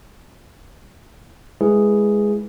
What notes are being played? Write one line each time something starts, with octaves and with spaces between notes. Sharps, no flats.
G#3 E4 G#4 B4